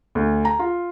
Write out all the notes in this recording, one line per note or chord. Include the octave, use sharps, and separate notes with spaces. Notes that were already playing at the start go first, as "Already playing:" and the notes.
D2
A#5
F4